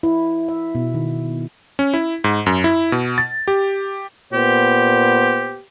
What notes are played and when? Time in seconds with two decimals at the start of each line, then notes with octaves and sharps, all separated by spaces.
0.03 E4
0.49 E5
0.75 B2
0.94 D#3
1.79 C#4
1.94 E4
2.24 G#2
2.46 F#2
2.64 E4
2.92 B2
3.18 A6
3.48 G4
4.33 A#2 B3 G4 C5